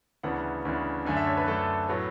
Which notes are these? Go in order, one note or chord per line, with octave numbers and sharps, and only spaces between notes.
D2 C#3 E3 B3 D4 F#5
D2 C#3 E3 B3 D4
F#2 D3 A3 D4 G#5
E5
C#5
B4
F#2 D3 A3 D4 A4
A2 F#3 B3